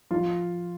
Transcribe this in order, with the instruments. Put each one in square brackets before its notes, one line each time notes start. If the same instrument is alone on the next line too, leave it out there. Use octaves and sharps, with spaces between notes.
[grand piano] F3 F4